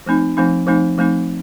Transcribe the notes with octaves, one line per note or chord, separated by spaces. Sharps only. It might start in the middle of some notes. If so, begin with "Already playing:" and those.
F3 A3 C4 D#4
F3 A3 C4 D#4
F3 A3 C4 D#4
F3 A3 C4 D#4